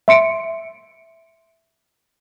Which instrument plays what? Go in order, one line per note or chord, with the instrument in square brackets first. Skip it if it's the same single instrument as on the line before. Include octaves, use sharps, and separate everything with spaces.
[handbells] E5 C6 C#7 D7